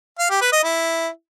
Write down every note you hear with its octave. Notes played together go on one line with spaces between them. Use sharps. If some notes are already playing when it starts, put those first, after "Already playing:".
F5
G4
B4
D#5
E4